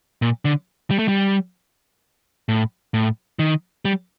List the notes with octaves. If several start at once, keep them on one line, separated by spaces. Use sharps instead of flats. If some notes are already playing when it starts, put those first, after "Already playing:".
A#2
D3
G3
A3
G3
A2
A2
D#3
G3